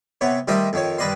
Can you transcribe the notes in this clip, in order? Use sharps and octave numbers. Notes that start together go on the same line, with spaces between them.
C3 B3 C#5
D#3 G3 A3 G4 C5 D#5
F2 D#3 C#5
G2 D#3 B4 D5 D#5 C6